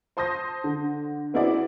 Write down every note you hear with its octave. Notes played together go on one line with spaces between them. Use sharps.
C5 A5 C6 D#6 G6 A#6
D3
B3 C4 E4 F#4 G#4 D5